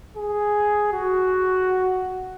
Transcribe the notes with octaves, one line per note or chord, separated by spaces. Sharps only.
G#4
F#4